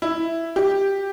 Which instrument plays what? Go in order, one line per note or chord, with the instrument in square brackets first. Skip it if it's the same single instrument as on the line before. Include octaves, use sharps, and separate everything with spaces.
[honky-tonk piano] E4
G4